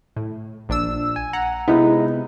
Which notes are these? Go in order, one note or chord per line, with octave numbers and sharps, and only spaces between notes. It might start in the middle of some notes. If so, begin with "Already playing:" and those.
A2
A#1 D4 E6
G#5
F#5 A#5
C3 G#3 B3 D#4 E4